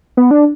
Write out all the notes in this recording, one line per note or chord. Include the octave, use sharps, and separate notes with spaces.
B3
D4